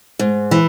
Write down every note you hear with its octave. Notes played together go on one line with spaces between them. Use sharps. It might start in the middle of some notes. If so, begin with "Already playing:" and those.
G#2
E3